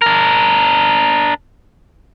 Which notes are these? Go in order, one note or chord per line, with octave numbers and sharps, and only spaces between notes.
D4 A#4